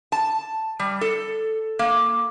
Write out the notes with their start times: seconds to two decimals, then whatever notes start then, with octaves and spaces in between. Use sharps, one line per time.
0.12 A5
0.79 G3
1.01 A4
1.79 A#3